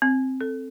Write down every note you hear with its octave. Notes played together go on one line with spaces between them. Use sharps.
C4
A4